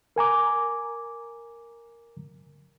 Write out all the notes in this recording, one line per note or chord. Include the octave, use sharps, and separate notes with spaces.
A#4 G#5 A#5 D6